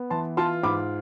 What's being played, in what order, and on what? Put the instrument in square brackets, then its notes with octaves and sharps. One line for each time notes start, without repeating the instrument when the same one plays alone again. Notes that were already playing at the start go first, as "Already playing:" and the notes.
Already playing: [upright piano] B3
E3 A5 C6
F4 A5 C6
G#2 B5 D6